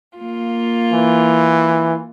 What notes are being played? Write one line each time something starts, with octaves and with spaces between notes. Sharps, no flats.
A#3 F4
E3